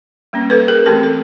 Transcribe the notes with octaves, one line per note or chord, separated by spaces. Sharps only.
G3 A#3 C#4
A4 B4
G#4 A#4
E3 A3 C4 G4 A4
A4